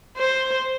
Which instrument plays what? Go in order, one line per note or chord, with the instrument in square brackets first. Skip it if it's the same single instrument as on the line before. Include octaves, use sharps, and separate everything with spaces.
[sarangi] C5